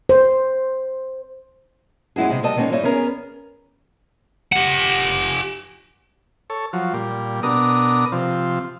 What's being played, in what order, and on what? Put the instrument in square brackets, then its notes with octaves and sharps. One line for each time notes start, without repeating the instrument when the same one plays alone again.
[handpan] C5
[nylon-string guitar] F#2 G#3 E4 F#4 G#4
C3 F#3 G#3
C3 G3 A#4 D#5 A5
D#3 G#3 A#3 B3 C#4 D#4
G#2 G3 D#4 C#5 E5
B3 C#4 G#4 A#4
[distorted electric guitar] G4 F#5
[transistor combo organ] A4 C#5
F3 F#3
A#2 G3
B2 D4 A#4 D#6
C3 F3